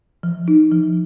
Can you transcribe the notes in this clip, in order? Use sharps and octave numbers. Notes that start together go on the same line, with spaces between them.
F3
D#4
F3